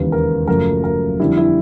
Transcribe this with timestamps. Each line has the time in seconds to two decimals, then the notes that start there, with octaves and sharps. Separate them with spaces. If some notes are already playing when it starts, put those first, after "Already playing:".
Already playing: E1 D#2 C#3 E3 B4
0.12 A#4
0.47 F#1 F#2 C#3 F3 A3 A#4
0.84 A#4
1.20 F2 D3 G3 E4
1.37 E4